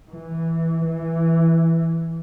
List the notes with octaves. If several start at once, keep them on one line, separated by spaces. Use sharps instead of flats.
E3
E3